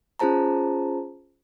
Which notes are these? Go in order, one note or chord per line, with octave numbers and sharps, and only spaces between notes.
C#4 F4 G#4 C5 A5 A#5